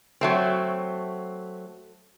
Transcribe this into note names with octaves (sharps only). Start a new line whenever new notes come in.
F#3 A3 C4